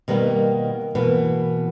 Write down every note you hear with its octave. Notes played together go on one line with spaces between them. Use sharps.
B2 D#3 G3 A#3 B3
B2 E3 A#3